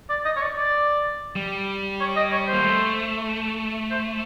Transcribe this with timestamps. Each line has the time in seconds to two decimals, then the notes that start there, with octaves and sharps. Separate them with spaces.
0.09 D5
0.25 D#5
0.36 C#5
0.41 D5
0.57 D5
1.36 G3
2.01 C#5
2.17 D#5
2.32 C#5
2.48 C5
2.53 A#3
2.64 A3
3.91 C5